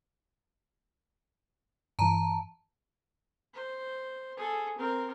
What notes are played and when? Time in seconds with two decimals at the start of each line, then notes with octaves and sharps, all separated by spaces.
1.99 G2 E3 A5 A#5
3.54 C5
4.37 G#4 A4
4.79 C4 A#4